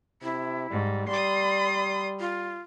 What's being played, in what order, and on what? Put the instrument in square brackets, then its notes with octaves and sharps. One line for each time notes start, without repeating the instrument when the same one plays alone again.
[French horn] C3 [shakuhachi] E4
[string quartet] G#2 [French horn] G3
[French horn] G3 [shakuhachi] D5 [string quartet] C6 D#6
[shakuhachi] F4